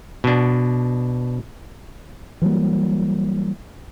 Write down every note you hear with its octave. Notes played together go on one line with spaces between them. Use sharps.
B2 D4
E3 F#3 G3 A#3